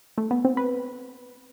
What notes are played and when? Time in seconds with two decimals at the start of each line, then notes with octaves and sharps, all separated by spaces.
0.18 A3
0.31 B3
0.45 C4
0.57 B4